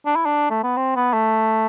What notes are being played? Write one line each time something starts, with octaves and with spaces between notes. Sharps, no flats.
D4
E4
D4
A3
B3
C4
B3
A3